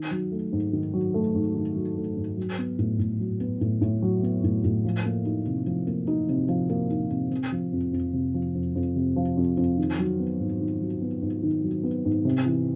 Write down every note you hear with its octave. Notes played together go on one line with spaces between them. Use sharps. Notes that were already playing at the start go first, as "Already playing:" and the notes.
Already playing: D#3
F#3
A3
G#2
D#3
F#3
A3
G#2
D#3
F#3
A3
G#2
F#3
B3
A2
A2
F#3
B3
A2
A2
F#3
B3
A2
A2
F3
A#3
D#4
C3
F3
A#3
D#4
C3
F3
A#3
D#4
C3
C3
F3
F2
F2
C3
F3
F2
F2
C3
F3
F2
F2
D#3
F#3
B3
G#2
D#3
F#3
B3
G#2
D#3
F#3
B3
G#2
C3
E3